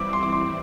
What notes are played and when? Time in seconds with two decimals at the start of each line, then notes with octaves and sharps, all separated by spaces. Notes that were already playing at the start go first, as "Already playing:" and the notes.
Already playing: E3 G3 C4 E4 D6
0.13 C6
0.23 D6
0.32 C6